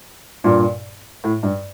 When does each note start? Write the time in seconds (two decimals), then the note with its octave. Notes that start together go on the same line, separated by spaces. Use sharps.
0.44 G2 A#2
1.24 A2
1.43 G2